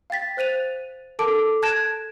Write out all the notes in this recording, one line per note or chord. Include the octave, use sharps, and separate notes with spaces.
F5 G5 A6 B6
C5 F#6 A6 D#7 F7
A4 A#4 A5 D6 D7
A5 F#6 G#6 A#6 D7 E7